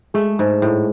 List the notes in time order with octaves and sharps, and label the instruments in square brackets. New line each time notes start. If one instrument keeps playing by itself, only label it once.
[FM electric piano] G#3 G#4 [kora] A3
[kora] G#2
A2